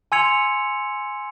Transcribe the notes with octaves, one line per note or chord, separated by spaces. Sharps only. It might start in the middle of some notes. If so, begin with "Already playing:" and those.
G#5 C6 E6 G#6 C#7 F7